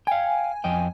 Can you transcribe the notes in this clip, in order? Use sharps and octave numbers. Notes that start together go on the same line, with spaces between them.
F5 G5 G#5
F2 D#5 G5